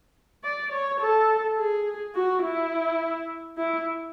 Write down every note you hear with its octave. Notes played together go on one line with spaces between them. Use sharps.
D5
C#5
A4
G#4
F#4
E4
E4